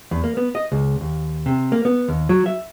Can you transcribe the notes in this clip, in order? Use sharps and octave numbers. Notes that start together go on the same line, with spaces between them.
E2
A#3
B3
D#5
C#2
D#2
C3
A#3
B3
D#2
F#3
E5